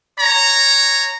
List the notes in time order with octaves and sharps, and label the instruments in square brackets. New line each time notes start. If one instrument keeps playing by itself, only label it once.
[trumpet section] C#5 A#5